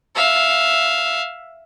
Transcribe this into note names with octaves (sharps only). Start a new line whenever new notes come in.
E5 F5